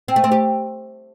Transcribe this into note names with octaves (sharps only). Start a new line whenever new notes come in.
C4
A3
C4
G4